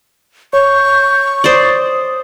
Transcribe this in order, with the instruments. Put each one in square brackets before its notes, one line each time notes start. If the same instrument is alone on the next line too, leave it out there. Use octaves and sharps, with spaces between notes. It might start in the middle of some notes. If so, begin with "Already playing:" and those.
[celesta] C#5 [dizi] C#6 [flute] G6
[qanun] C5 D5 [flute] D#6